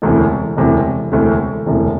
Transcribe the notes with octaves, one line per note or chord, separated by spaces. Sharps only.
E1 D2 C3 E3
E1 D2 C3 E3
E1 D2 C3 E3
E1 D2 C3 E3